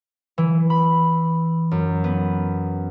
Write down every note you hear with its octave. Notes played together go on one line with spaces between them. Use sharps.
E3
B5
F#2
B3